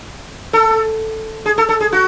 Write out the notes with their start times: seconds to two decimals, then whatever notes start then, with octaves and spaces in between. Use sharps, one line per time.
0.53 A4
1.46 G#4
1.58 A4
1.69 A4
1.81 G#4
1.92 F#4